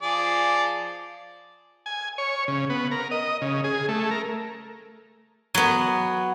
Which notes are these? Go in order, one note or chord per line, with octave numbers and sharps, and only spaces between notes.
F3 G#4 D5
G#5
C#5
C#3
B3
A#4
D#5
C#3
G#4
A3
A#4
F#3 B3